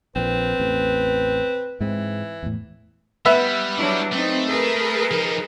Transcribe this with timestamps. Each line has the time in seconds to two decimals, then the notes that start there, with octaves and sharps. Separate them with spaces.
0.16 A#1 A#2 C4 B4
0.60 A1 E2
1.80 G#2 E3 G#3 C4
2.43 E2 A2
3.26 G3 B3 E5
3.77 F#3 D4 E4
4.12 A3 C4 D#4
4.47 G#4 A#4 B4
5.11 F3 D#4